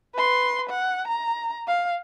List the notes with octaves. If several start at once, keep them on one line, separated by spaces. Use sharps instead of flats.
B4 C6
F#5
A#5
F5